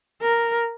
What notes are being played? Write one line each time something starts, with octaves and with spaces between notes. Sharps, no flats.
A#4